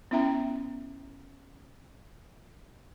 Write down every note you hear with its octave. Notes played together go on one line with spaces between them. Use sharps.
B3 C#4 E4 E5 G5 A#5